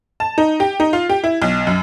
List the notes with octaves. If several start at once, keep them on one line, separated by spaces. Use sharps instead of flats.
A5
D#4
G4
D#4
F4
G4
E4
B1
F#2